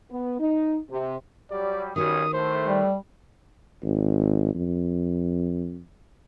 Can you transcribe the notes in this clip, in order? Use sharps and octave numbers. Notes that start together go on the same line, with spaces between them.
B3
D#4
C3
F#3 G3 D5
B1 D#3 G3 C#4 F#4 D#6
A2 A3 C5
G3
G#1
F2